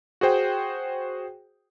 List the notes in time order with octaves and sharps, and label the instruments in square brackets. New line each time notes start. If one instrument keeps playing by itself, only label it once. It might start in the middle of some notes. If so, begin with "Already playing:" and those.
[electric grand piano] F#4 G#4 C5 G5